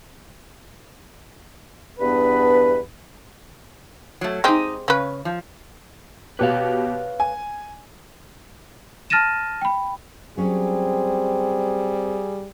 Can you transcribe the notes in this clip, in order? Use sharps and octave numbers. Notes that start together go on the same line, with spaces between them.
E2 G2 B3 D4 B4
F#3 A3
G#3 C4 D#4 G4 D#5
C#3 C#4 B4
F3
B2 G4 B4 C#5 F5
G#5
A5 F6 A6 A#6 D#7 E7
G5 B5
F#3 G3 C4 C#4 G#4